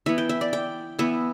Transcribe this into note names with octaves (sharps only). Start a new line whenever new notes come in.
E3 B3 E5
G5
E5
D5
G5
E3 B3 E5